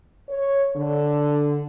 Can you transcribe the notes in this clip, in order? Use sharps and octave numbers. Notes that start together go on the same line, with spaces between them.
C#5
D3